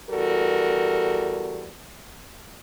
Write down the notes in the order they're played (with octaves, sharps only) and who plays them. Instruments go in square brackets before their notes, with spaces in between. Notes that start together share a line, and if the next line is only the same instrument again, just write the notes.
[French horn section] E2 G3 F#4 A4 A#4